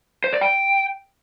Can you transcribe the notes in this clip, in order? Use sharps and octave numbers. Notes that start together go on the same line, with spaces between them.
C5
D5
G5